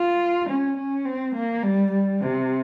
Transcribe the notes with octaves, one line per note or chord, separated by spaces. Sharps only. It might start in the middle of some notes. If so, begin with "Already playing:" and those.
Already playing: F4
C#4
C#4
C4
A#3
G3
G3
C3